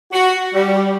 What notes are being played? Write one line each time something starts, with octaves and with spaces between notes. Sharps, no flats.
F#4
G3